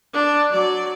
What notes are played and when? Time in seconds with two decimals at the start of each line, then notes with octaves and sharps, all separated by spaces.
0.14 D4
0.50 F#3 D5